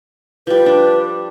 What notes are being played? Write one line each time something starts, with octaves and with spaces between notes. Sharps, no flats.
F3 G3 B4
D4